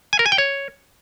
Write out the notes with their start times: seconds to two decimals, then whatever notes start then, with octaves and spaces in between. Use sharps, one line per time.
0.13 G#5
0.19 A#4
0.26 G#5
0.32 G5
0.38 C#5